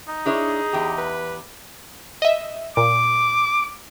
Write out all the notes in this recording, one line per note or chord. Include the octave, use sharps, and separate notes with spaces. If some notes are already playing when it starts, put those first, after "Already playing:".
D#4
D4 E4 G#4 C#5
E2 G4
B4
D#5 E5
A#2 D6